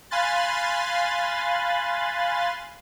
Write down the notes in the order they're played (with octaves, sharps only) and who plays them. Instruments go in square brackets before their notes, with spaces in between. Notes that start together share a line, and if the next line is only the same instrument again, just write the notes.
[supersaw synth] F5 G#5 B5 C6 F#6 A6